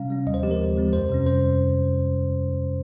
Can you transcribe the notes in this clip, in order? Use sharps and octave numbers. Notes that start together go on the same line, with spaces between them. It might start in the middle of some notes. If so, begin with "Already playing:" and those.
Already playing: C3 G3 C#4 F5
G3 C#4
D#2 D#5
C5
C#3 F3 G#3 C4 G4
A#4
D#2
C#3 F3 G#3 C4
F2 C5
C3 G3 C#4
F2 C5